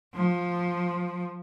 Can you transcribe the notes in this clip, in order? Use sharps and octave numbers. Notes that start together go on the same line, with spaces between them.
F3